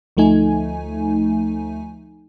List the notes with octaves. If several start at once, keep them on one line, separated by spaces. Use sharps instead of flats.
D2 F3 A3 D#4 G#5